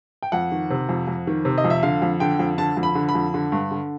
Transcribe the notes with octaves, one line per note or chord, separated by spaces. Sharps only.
G5
F2 F#5
D#3
C3
F2
F2
D#3
C3
D#5
F2
E5
D3 F5
F2
D3 G5
F2
D3 A5
F2
B5
D3
B5
F2
D3
G2
D3